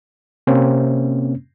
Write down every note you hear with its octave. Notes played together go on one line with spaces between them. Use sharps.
C3 A#3 C4 C#4